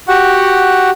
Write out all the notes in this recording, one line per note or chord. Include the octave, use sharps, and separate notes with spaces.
F#4 G4 F#5